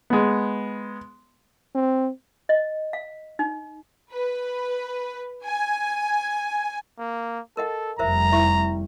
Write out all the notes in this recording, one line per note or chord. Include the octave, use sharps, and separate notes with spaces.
G#3 B3
C4
D#5
F5
D#4
B4
G#5
A#3
A4 A#4 D#5 F#5
F1 F2 G3 A#4 C5 E5 A#5
E4 E5 C#6